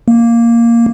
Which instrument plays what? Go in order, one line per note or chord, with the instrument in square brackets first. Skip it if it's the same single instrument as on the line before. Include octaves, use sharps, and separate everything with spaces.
[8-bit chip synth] A#3